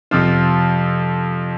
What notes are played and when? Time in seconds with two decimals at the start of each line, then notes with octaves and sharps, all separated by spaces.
0.11 F2 C3 F3 C4 F4